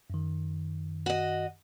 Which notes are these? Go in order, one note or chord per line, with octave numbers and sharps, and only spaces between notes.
F#2 D#3
F#4 D#5